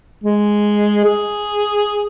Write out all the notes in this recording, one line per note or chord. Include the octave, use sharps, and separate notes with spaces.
G#3
G#4